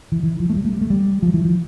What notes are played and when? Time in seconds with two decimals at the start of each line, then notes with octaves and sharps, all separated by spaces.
0.12 E3
0.23 E3
0.40 F3
0.50 A3
0.56 G3
0.65 A3
0.73 G3
0.81 A3
0.90 G3
1.22 F3
1.34 E3
1.45 F3